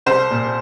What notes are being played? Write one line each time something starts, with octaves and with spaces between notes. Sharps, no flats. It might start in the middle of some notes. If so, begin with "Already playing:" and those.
C2 C5
A#2